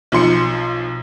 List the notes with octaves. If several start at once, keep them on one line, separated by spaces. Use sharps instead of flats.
B1 F3 C6 C#7